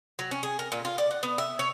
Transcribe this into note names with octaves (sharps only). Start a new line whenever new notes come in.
F#3
C#4
G#4
A#4
A#2
F4
D5
F#5
B3
E5
C#5